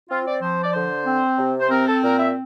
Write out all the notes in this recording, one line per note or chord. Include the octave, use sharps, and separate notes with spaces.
C4 F4
D5
F3 C5
D5
D3 C5
C4
C3
C5
C4 A#4
A4
A#2 A#4
E5